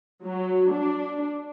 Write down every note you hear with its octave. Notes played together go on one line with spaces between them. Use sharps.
F#3
D4